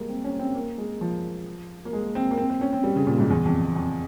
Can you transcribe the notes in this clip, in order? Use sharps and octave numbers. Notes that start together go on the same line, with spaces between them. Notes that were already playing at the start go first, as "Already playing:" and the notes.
Already playing: G3 G#3 A#3
C4
C#4
C4
A#3
G#3
F3
A#3
G#3
C4
A#3
C4
C4
C#4
C4
G3
C#3
A#2
G#2
E2
F2
F2
F2